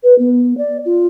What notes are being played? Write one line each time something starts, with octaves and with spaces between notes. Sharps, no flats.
B4
B3
D5
F4